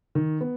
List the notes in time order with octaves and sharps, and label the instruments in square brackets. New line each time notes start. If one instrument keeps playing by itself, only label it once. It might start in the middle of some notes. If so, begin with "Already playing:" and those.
[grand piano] D#3
B3